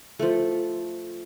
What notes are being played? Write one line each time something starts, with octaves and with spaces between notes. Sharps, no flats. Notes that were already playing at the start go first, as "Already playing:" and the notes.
F3 A3